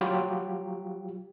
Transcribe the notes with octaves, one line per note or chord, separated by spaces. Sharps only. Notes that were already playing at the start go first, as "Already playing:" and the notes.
F#3 F4 G4